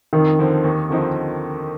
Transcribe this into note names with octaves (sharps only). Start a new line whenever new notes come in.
F2 D#3
D3 F3 C4
D#2
D3 F3 C4 D#4